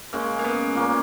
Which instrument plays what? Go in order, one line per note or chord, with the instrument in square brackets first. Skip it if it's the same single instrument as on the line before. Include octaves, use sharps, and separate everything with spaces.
[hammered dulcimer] C#3 G#3 C#4 [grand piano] A#3
[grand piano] A#3
B3
[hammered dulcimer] A#2 A#3 C#4